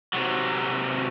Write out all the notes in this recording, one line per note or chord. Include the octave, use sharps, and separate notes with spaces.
C3 F#3